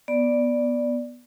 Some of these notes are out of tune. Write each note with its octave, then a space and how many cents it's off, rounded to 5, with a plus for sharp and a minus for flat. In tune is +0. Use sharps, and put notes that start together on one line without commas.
B3 -10 D5 +0